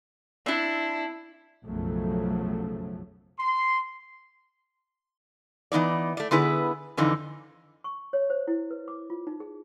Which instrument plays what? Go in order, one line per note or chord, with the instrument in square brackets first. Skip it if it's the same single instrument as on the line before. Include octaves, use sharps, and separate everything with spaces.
[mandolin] C4 D4 [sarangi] E4
[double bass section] B1 F#2 C#3 F3 F#3 A3
[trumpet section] C6
[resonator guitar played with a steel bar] E3 B3 D#4 D5
A3 D5
D3 B3 E4 G#4 B4
F2 D3 E3 D#4
[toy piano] C#6
C#5
C5
E4
B4
D6
F4
D#4
G#4